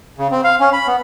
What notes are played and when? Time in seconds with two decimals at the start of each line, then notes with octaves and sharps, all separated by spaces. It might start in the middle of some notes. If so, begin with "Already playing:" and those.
0.18 C#3
0.31 C4
0.44 F5
0.60 C#4
0.73 B5
0.87 B3